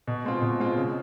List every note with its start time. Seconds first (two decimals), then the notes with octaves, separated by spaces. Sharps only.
0.07 B2
0.24 G#3 C4 F4
0.42 B2
0.60 G#3 C4 F4
0.76 C#3